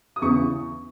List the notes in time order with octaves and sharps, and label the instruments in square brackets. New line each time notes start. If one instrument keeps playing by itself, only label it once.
[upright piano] D#6
E2 C#3 E3 B3 C#6